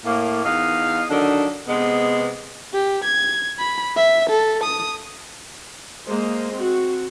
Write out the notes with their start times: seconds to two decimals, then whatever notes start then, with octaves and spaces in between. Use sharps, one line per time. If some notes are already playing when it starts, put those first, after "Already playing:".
0.05 A2 A#3
0.44 E2 D#4 D#5 F5
1.10 D3 D#3 F#3 D4
1.68 C3 G#3 B3
2.74 G4
3.04 G#6
3.59 B5
3.97 E5
4.29 A4
4.63 D#6
6.08 G#3 A#3 C5 D#5
6.54 C4 F#4